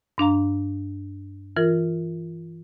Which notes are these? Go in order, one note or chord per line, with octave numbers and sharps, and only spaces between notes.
G2 D4 F5 A#5
E3 F4 A#4